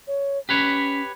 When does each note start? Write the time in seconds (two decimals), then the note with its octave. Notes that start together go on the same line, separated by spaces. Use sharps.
0.07 C#5
0.49 C#4 G4 B4 C#5